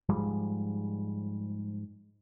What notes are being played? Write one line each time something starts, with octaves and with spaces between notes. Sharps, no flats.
G#2 F3 G3 G#3